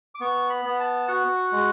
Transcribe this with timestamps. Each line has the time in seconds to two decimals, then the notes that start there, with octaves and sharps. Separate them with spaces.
0.15 D6
0.21 B3 C#6
0.50 B5
0.65 B3
0.80 A5
1.08 F#4 F#5
1.52 G#3